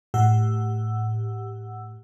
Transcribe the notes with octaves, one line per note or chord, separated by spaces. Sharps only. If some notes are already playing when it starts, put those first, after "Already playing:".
A2 G4 F#5 E6